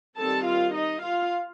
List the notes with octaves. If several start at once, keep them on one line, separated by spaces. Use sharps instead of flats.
D#3 G3 C4 A4 A5
F4 F5
D#4 D#5
F4 F5